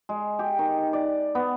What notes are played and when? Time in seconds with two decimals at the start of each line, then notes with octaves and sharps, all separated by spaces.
0.09 G#3
0.39 G4
0.59 D#3
0.93 D5
1.35 B3